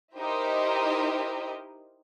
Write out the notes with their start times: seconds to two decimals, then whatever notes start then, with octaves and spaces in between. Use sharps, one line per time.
0.18 D#4 E4 G4 A#4 C5 D#5